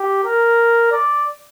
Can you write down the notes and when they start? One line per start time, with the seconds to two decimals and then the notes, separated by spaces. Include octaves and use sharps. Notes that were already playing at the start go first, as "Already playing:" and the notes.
Already playing: G4
0.24 A#4
0.91 D5